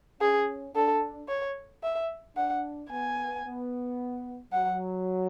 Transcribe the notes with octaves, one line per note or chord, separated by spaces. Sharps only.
C#4 G#4
D4 A4
C#5
E5
D4 F#5
B3 G#5
B3
F#3 F#5